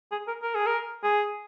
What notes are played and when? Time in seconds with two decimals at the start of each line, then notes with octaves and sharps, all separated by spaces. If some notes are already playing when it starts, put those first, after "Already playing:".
0.12 G#4
0.28 A#4
0.42 A#4
0.55 G#4
0.66 A#4
1.03 G#4